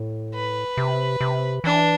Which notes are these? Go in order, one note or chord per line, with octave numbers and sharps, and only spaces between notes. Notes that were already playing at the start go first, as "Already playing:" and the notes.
Already playing: A2
B4
C3
C3
E3 D4